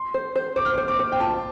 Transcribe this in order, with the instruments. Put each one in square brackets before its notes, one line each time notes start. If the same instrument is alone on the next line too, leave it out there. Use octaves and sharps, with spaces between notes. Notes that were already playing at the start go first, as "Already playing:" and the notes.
Already playing: [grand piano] C6
[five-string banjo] C5
C5
[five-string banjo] C5 [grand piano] D6
[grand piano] F6
[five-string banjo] C5 [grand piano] D6
[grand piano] D6
[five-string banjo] C5
[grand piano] G5
[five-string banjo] F4 [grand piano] A5